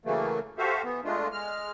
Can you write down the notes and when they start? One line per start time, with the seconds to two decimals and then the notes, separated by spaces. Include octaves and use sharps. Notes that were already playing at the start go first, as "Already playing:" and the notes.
0.05 C#3 E3 F#3 A3 A#3
0.58 F#4 G4 A4 C5 E5 F5
0.84 E3 B3
1.05 G#3 A3 D4 F4
1.32 G#3 F6